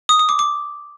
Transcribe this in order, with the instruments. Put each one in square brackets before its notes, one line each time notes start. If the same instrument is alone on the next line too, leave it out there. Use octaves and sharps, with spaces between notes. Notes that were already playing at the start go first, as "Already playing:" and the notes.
[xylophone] D#6
D#6
D6
D6